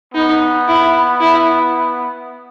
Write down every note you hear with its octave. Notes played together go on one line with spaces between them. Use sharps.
B3 D#4
E4
E4